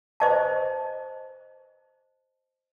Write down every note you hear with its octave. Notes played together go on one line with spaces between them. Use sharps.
C5 D#5 A5